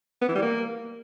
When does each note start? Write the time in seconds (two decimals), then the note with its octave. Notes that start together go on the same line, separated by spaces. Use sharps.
0.21 B3
0.28 E3
0.35 G3
0.42 A#3